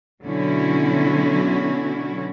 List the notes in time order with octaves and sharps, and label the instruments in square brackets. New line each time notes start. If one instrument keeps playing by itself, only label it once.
[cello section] B2 D3 F#3 C#4 E4 F#4